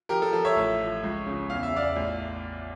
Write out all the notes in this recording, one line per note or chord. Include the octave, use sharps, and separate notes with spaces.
F3 G4 A#4
A4
F3 A4
C#5 E5
A1
F3
C#2
C#3
E2 F5
E5
E2 D5 F5
A1